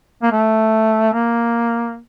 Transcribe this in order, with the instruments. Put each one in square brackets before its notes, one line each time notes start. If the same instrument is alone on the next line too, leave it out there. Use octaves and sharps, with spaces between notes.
[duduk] A#3
A3
A#3